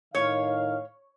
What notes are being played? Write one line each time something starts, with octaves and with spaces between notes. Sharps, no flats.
A2 D#3 C#5 F5